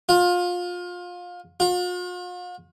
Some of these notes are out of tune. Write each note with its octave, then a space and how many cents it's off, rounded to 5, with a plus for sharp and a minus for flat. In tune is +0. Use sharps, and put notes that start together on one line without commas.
F4 +25
F4 +45